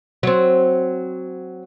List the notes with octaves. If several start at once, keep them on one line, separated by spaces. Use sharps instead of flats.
F#3 C4